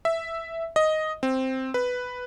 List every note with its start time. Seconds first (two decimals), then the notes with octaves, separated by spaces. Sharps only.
0.05 E5
0.76 D#5
1.23 C4
1.74 B4